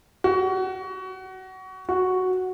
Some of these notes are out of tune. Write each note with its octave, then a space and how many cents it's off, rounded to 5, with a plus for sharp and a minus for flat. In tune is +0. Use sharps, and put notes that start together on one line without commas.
F#4 +25
F#4 +0